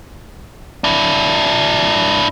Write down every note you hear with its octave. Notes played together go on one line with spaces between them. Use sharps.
D4 E4